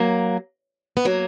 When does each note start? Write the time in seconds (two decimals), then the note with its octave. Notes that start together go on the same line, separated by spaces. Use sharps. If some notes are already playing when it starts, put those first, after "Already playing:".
Already playing: F#3 A#3
0.97 B3
1.05 F#3 A#3